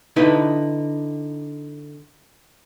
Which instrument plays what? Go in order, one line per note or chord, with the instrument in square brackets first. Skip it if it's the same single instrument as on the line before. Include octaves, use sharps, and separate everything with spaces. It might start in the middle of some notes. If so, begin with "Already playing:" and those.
[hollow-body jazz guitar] D3 D#4 E4 B4